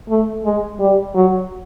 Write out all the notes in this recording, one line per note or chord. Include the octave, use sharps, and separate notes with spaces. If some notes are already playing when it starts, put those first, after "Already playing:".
A3
G#3
G3
F#3